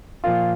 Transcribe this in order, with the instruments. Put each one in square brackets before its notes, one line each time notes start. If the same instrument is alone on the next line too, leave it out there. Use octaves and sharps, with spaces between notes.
[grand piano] A#2 F3 F4